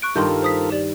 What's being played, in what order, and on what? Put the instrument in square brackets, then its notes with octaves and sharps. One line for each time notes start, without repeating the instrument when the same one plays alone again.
[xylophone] C#6 F#6 D7
[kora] G2 D#3 [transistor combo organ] F4 A4 A#4 [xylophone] C6 G6
[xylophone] C5 D#6 B6
G4 D5 F#7